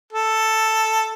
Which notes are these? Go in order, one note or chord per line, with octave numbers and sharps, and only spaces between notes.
A4